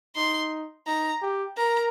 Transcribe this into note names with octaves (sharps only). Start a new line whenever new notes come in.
D#4 C6
D#4 A#5
G4
A#4 A#5